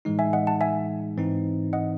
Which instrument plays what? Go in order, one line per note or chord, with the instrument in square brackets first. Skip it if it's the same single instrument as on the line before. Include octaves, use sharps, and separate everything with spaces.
[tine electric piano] A2 E3 G#3 D#4
[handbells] E5 G#5
D#5 F#5
F#5 A5
E5 G#5
[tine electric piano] G#2 E3 C4 D#4
[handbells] D#5 F#5